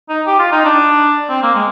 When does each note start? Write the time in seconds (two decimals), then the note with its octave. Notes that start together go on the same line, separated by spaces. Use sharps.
0.09 D#4
0.26 G4
0.39 F4
0.52 D#4
0.65 D4
1.29 C4
1.43 A#3
1.55 G#3